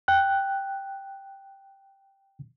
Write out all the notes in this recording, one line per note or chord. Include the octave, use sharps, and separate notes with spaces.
G5 F#6